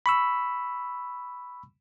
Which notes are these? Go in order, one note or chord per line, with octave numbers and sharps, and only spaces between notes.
B5 C#6 E6